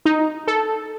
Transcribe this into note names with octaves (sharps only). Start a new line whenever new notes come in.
D#4
A4